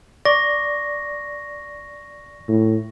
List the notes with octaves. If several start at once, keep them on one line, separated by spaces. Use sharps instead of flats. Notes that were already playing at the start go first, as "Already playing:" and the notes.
D5 C#6 A#6
A2